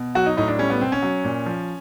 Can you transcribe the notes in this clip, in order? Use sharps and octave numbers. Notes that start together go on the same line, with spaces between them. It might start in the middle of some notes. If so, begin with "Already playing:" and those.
Already playing: B2
F#3 F#4
D#4
A2 D#4
D4
G3 C#4
B3
B2 C4
C#4
F#3
A#2
F3